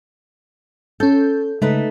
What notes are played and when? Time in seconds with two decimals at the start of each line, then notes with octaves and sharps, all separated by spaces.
1.00 C#4 A4 G6
1.62 C#3 G#3 A3 D#4 B4